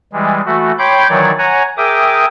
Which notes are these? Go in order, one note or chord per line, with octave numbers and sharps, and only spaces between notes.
E3 G3 G#3
E3 A3 F#4
C#5 G5 B5 C6 D6 G6
D#3 E3 F#3 C#5 D5
C#5 F#5 G#5 A#5
G#4 A#4 E5 G5 D6 D#6